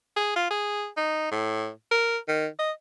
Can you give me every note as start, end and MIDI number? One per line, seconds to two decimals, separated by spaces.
0.16 0.35 68
0.36 0.46 65
0.50 0.87 68
0.97 1.29 63
1.31 1.70 45
1.91 2.17 70
2.28 2.47 51
2.59 2.71 75